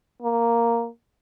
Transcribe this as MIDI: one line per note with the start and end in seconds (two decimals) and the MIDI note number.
0.22 0.88 58